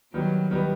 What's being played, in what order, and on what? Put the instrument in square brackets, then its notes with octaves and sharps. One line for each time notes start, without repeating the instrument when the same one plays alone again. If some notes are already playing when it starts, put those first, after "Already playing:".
[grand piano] D#3 G3 B3 [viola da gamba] F#3
[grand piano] D#3 G3 B3